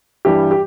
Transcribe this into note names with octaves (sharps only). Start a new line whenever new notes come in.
G2 E3 G3 G4
G4